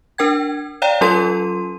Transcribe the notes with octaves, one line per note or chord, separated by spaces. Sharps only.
D4 A#4 G5 G#6
C#5 D5 F5 G5 A#5
F#3 C#4 F4 A4 C6 D#7